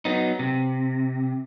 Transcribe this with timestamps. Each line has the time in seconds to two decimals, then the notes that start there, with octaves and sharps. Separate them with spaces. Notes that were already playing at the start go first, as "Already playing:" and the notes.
0.05 F#3 B3 D#4
0.39 C3